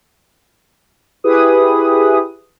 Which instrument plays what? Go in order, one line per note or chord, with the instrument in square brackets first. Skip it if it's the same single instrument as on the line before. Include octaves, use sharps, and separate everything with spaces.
[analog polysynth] E4 G4 G#4 B4 D#6